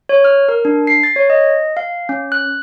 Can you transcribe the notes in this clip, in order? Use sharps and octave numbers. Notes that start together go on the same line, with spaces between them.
C#5
F6
A#4
D4
C7
A6
C#5
D#5
F5
C#4
F#6